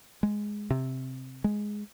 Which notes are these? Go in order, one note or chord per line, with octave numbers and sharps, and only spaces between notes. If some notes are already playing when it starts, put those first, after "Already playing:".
G#3
C3
G#3